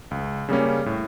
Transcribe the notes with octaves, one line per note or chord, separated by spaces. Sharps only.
C#2
C#3 G3 A#3 C#4
A2